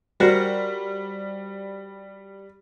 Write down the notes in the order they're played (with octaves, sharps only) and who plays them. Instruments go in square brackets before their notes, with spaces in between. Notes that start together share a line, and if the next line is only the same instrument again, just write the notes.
[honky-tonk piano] G3 [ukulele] F#4 A#4 C5